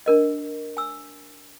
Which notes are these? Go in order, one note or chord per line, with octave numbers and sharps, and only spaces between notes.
D4 A#4 D#5
G#5 E6